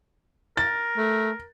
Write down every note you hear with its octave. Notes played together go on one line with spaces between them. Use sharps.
A#4 A6
A3